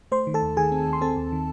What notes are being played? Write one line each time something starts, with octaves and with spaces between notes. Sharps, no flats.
A3 C5 C6
D#3
A4 A5
D#2
D#3 G#4 G#5
C4
D#2
C6
C4 A4 A5
D#2
D#3